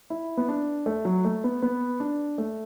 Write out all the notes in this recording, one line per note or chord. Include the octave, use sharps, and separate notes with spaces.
E4
B3
D4
A3
F#3
A3
B3
B3
D4
A3